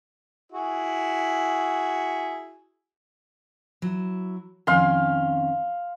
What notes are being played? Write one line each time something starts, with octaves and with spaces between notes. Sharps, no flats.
E4 F#4 G#4
F#3 E4
F2 D#3 C#4 F5 C6